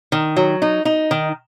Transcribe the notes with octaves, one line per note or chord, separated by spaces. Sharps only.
D#3
F#3
D#4
D#4
D#3